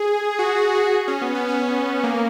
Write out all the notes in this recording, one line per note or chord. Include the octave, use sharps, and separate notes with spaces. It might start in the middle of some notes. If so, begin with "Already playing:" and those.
Already playing: G#4
F#4
F#4
F#4
C#4
B3
B3
C#4
A#3